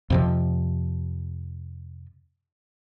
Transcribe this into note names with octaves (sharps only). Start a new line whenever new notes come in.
F2 C3 F3